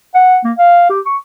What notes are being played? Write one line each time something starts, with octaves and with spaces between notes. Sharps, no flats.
F#5
A#3
F5
G4
C#6